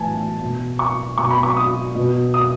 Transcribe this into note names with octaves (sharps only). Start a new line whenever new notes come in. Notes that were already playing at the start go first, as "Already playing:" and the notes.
Already playing: A2 E3 G#5 A5
B2
C#6
B2 C#6
B5
C#6
D#6
B2
D#6